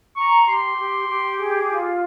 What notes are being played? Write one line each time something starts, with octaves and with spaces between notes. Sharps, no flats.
A#5 C#6
G4 C6
G4
G4
G#4
F4